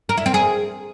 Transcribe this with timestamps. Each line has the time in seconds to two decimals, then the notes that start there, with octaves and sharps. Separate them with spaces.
0.09 A#4
0.17 E4
0.26 C4
0.34 G#4